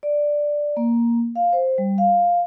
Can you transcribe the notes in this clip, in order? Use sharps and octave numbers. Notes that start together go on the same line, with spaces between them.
D5
A#3
F5
C5
G3
F5